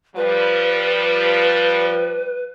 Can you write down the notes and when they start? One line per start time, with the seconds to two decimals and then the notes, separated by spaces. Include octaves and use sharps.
0.16 F3 G3 B4